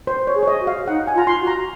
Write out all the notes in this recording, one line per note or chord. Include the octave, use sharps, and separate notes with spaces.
C5
C#5
G#4
C#5
D#5
F#4
F5
D#4 F#5
G#5
F4
A#5
C6
F#4
A#5